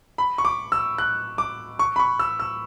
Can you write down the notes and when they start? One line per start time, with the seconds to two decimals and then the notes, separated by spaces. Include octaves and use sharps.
0.18 B5
0.38 C#6
0.45 D6
0.72 E6
0.98 F#6
1.38 D6
1.79 C#6
1.96 B5
1.99 C#6
2.19 E6
2.40 E6